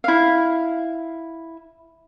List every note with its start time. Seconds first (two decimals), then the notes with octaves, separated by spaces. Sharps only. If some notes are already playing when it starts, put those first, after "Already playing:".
0.04 E4 F5